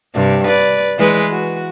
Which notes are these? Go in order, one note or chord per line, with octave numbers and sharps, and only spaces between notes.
G2 C3
B4 D5
E3 G#3 B4
F#4